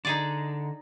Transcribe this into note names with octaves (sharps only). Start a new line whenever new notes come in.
D3 D#4 G#4 D5